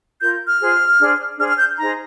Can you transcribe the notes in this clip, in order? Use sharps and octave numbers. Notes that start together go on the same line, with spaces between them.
F4 A#4 G6
F6
F4 G#4 C5
D4 G#4 C5
D4 G#4 C5 F6
F6
G6
D#4 G#4 C5 A#5